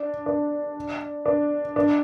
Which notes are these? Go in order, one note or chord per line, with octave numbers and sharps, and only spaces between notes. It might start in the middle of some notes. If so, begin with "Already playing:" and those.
Already playing: D4
D4
D4
D4